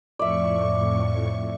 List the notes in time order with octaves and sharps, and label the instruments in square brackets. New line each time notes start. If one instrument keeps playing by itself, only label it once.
[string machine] F2 A2 C#6 [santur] D5 E5